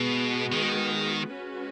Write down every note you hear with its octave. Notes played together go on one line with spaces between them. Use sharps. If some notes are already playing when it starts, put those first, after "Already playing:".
Already playing: B2 G#3 B3 F#4
D#3
G#3 C#4 F#4 B4